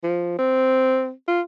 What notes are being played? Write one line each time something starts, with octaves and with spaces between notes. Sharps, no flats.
F3
C4
F4